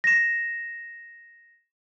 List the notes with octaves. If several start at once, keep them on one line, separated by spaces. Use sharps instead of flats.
A#6 E7